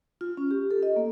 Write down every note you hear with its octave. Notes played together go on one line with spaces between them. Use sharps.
F4
C#4
G4
A4
D#5
A#3